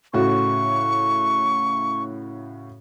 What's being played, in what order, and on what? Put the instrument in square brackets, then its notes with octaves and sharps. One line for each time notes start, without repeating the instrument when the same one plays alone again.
[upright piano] A2 C#3 F#4 [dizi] C#6